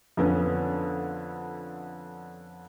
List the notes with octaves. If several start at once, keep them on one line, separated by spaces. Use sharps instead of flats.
F2 D3 B3 C#4